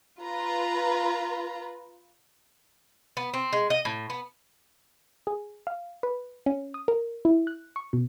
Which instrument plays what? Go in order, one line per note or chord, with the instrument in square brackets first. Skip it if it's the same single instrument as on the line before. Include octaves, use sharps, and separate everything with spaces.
[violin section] F4 B4 A#5
[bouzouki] B3
C4
G#3
D#5
A2
B3
[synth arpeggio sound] G#4
F5
B4
C#4
D#6
A#4
E4
F#6
C#6
B2